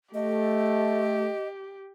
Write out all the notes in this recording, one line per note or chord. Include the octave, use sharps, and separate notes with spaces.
A3 G4 D#5